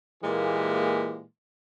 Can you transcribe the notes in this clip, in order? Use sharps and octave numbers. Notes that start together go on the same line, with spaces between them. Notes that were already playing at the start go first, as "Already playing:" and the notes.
A#2 E3 G#3 A#3 G4